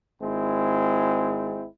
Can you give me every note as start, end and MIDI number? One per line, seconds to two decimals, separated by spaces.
0.22 1.65 32
0.22 1.65 56
0.22 1.65 60
0.22 1.65 64